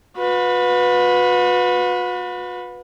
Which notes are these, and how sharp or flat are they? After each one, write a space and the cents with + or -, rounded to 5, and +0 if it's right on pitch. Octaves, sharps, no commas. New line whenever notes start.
F#4 -45 B4 +0